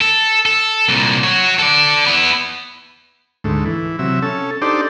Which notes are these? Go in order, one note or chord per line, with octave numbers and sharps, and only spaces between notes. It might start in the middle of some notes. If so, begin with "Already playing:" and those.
A4
A4
C2 A#2
F#4 C#5
A4 D5
B3 E4
D2 G#2 A3
E3
C3 F#3 E5
C#4 A4
D4 D#4 G4 A4 C5 D5